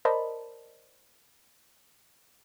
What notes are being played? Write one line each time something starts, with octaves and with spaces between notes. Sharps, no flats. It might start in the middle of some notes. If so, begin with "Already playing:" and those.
A#4 C5 D5 D#5 A5 B5